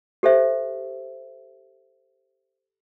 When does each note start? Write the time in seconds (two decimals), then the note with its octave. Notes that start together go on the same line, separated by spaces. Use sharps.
0.23 G4 A4 C5 E5